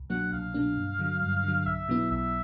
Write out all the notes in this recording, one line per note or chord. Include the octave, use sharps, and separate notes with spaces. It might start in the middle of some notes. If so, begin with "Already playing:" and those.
Already playing: C2
B2 F#3 A#3 D4 F#5
C2 F5
B2 F#3 A#3 D4
G2
D3 F#3
G2
D3 F#3
B1 E5
B2 F#3 B3 E4
B1 E5